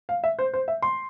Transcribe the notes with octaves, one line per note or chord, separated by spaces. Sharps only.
F5
E5
C5
C5
E5
C6